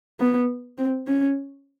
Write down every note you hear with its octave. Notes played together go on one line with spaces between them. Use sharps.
B3
C4
C#4